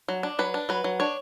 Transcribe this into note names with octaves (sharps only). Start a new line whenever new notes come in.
F#3
D4
F#3 B4
D4
F#3 B4
F#3
D4 C#5